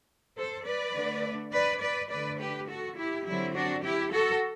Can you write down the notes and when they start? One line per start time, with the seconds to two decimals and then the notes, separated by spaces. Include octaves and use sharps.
0.37 A4 C5
0.65 B4 D5
0.95 D3 A3 D4
1.53 B4 D5
1.81 B4 D5
2.10 D3 A3 D4 B4 D5
2.39 G4 B4
2.68 F#4 A4
2.97 E4 G4
3.26 D3 F#3 C4 E4
3.55 D4 F#4
3.83 E4 G4
4.12 F#4 A4